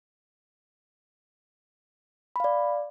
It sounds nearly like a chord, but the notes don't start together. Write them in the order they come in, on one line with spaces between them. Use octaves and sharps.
B5 F5 D5